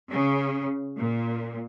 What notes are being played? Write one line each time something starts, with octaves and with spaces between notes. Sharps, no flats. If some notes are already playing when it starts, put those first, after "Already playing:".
C#3
A#2